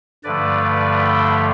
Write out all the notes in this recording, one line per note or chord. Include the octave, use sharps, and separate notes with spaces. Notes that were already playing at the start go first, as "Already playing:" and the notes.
G2 D3 F3 A3 B4 D5
B4 D5
G5 B5